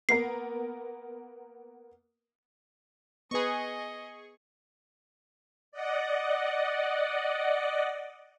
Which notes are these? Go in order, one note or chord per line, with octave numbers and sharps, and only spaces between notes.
A#3 B3 A#4 C7
B3 G#4 B4 D#5 C#6
D5 D#5 F#5